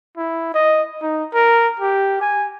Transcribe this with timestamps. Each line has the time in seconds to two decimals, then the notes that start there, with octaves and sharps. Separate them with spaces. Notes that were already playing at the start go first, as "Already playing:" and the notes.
0.17 E4
0.54 D#5
1.02 D#4
1.33 A#4
1.80 G4
2.21 G#5